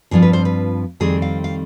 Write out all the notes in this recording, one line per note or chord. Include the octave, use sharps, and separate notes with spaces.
G2 F3 C4 F4 G#4
B4
C5
B4
F2 D#3 G3 C4 G#4
F5
F5